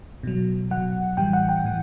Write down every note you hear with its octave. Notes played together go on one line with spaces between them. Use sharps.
B2 F#3
B2 F#3 F#5
A2 E3 G3 G5
F#5
G5
A2 E3